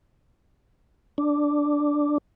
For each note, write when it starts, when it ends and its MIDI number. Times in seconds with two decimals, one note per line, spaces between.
1.18 2.18 62